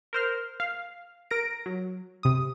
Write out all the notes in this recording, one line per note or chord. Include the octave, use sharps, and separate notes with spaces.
A#4 C5 F6
F5
A#4 A#6 D7
F#3
C3 D#6